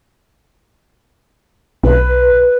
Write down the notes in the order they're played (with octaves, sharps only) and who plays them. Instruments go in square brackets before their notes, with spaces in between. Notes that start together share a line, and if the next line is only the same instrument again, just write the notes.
[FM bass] B1 [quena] B4